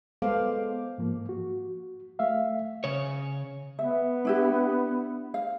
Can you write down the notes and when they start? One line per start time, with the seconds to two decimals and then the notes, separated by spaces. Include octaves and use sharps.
0.22 G#3 B3 A4 C5 F5 D6
0.98 G#2 F3 A#3
1.29 F#4
2.19 A3 E5 F5
2.84 C#3 C#5
3.79 B3 E5
4.25 D4 E4 G4
5.34 F5